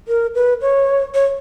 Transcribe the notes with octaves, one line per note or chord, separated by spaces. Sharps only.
A#4
B4
C#5
C#5